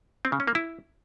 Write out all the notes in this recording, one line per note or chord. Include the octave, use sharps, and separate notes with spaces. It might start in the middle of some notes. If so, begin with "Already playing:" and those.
C4
C#3
C#4
A#3
E4